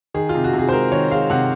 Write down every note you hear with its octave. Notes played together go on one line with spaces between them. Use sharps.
D#3 G#4
F4
C3
F#4
C3
G#4
C5
G#3 A#4
D#3 C#5
G#3 F5
C3 F#5